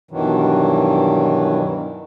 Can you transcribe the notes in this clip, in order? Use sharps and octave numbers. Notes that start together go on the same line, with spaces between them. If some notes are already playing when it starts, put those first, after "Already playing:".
G2 B2 D#3 E3 F#3